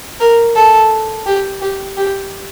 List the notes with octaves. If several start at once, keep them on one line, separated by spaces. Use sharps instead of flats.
A#4
A4
G4
G4
G4